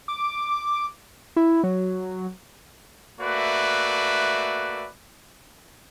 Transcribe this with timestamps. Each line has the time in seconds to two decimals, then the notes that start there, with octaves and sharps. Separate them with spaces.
0.08 D6
1.36 E4
1.63 F#3
3.21 A3 A#3 F#4 B4 D5 E5